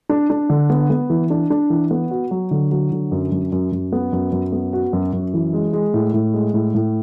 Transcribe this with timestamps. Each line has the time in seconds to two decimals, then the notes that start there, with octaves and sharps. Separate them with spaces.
0.09 D4
0.30 D4
0.50 D3
0.70 B3
0.90 B3
1.10 E3
1.30 D4
1.50 D4
1.70 E3
1.91 B3
2.11 F#4
2.31 F#3
2.51 D3
2.71 F#3
2.92 D3
3.12 F#2
3.32 F#2
3.52 F#2
3.72 F#2
3.92 B3
4.13 F#2
4.32 F#2
4.52 B3
4.73 F#4
4.93 F#2
5.13 F#2
5.34 E3
5.53 G#3
5.73 G#3
5.94 A2
6.14 A2
6.34 G#3
6.54 A2
6.74 A2